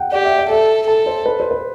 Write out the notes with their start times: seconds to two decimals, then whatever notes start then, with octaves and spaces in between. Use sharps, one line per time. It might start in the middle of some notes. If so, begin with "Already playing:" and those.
Already playing: F#5 G5
0.12 G4 D5
0.25 E5
0.38 D5
0.50 A4 E5
0.87 A4 A5
1.06 C5
1.26 B4
1.40 C5
1.51 B4